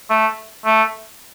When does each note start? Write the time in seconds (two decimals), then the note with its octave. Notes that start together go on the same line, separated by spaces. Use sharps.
0.10 A3
0.66 A3